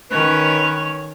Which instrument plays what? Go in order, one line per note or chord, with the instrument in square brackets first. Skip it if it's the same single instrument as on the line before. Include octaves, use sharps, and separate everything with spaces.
[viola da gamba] D#3 C#4 C#5 [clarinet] B4